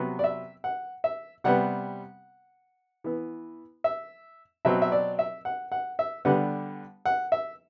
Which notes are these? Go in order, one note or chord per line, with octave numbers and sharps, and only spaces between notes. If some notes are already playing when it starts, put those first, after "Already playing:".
Already playing: C3 F#3 B3
D5
E5
F#5
E5
C3 G3 B3 F#5
E3 B3
E5
B2 F#3 C4 E5
E5
D5
E5
F#5
F#5
E5
D3 G3 B3 F#5
F#5
E5